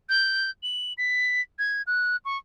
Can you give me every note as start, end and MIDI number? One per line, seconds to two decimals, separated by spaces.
0.09 0.50 91
0.63 0.93 102
0.98 1.41 95
1.59 1.82 92
1.87 2.16 90
2.25 2.37 85